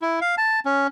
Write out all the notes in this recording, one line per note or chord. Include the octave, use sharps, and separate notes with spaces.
E4
F5
A5
C#4